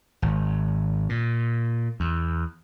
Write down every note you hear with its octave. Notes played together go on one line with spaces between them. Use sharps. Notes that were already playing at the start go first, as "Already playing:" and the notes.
G#1
A#2
E2